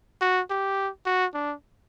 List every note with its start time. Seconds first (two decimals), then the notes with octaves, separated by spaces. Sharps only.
0.22 F#4
0.50 G4
1.06 F#4
1.34 D4